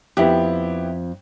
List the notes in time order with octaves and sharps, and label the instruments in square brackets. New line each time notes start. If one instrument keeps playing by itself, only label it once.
[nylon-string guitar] F2 [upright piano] B3 E4 G4